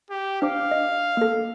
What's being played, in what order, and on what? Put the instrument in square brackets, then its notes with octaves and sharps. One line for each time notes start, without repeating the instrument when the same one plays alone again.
[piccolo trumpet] G4
[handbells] D4 C5 D6 [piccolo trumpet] F5
[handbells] D#5
A#3 A4